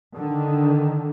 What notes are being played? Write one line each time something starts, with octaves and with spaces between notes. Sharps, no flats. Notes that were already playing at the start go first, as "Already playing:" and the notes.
D3 D#3